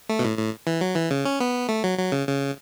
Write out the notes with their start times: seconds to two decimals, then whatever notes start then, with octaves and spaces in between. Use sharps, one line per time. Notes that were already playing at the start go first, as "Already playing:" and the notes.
0.09 A3
0.19 B2
0.24 A2
0.37 A2
0.67 E3
0.81 F#3
0.95 E3
1.10 C#3
1.25 C#4
1.40 B3
1.69 A3
1.84 F#3
1.98 F#3
2.12 C#3
2.27 C#3